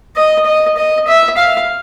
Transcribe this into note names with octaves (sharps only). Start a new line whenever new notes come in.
D#5
D#5
D#5
E5
F5